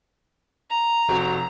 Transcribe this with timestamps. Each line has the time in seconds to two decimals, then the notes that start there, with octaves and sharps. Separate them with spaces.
0.70 A#5
1.09 F1 C4 F#4